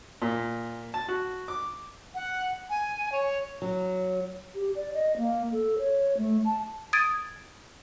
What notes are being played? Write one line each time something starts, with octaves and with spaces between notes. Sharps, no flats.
A#2
A5
F#4
D6
F#5
G#5
C#5
F#3
G4
D5
D#5
A#3
A4
C#5
A3
A5
D#6 G#6 A6 D7 D#7